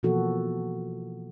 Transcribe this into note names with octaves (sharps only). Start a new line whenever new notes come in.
B2 E3 F3 A#3 F#4 A4